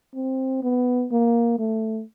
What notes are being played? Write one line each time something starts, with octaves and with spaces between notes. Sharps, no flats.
C4
B3
A#3
A3